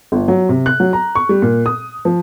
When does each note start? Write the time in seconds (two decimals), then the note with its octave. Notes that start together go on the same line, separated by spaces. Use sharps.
0.12 G1
0.28 F#3
0.49 C3
0.66 F#6
0.80 F#3
0.93 A#5
1.15 C#6
1.29 G3
1.42 A#2
1.66 D#6
2.05 F3